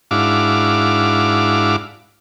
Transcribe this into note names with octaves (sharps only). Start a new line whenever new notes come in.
G#2 D4 E4 F#4 F5 D6